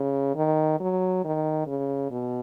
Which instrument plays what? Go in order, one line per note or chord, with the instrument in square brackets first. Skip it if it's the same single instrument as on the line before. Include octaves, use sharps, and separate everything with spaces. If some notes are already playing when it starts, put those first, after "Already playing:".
Already playing: [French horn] C#3
D#3
F#3
D#3
C#3
B2